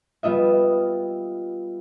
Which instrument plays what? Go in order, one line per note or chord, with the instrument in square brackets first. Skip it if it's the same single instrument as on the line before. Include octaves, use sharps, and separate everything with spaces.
[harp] G3 B3 F4 D#5 E5